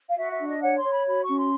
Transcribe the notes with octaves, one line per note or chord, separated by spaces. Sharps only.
F5
F#4 E5
E5
D4
D#5
C#5 F#5
C6
C#5
B5
F#4 B5
C#6
C#4
C6